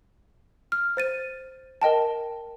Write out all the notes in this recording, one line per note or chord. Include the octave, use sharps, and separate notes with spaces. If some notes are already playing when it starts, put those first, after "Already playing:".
F6
C5 A6 D#7
A#4 D#5 G5 A5